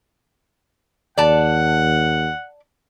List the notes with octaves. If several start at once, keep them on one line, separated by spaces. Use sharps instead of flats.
D#2 D5 F#5 A5